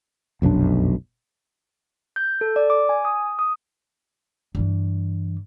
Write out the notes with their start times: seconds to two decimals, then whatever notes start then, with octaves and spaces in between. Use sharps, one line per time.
0.42 F1 B1 F#2 D4
2.16 G6
2.41 A4
2.56 D5
2.70 D6
2.89 G#5
3.05 D#6
3.39 D#6
4.55 G2 E3